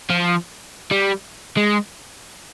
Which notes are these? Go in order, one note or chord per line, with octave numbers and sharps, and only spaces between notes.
F3
G3
G#3